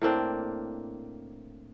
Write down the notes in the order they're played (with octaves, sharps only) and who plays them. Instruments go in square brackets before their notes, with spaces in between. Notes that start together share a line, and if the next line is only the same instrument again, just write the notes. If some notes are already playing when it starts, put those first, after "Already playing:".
[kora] A2 A#3 C4 D4